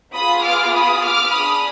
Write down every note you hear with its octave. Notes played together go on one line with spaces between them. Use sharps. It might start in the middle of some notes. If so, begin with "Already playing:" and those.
B3 F4 G#4 B5 D#6
D6 F6
B5 D#6
D6 F6
D4 G#4 B5 D#6